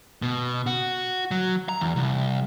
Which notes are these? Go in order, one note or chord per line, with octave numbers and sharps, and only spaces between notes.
B2
F#4
F#3
A#5
E2
C2